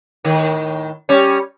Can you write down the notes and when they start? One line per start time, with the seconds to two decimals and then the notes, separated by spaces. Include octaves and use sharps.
0.24 A2 D#3
1.09 G3 C#4